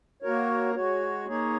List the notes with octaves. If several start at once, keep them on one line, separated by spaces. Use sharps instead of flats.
A#3 F#4 A#4 C#5
G#3 F#4 C#5
A#3 D#4 G#4 C#5